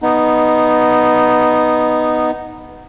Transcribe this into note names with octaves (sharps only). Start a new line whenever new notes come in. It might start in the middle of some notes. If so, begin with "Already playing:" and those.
B3 D#4